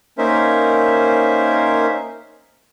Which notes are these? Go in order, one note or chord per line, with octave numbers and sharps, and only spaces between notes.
A#3 C#4 D#4 A#4 C5 E5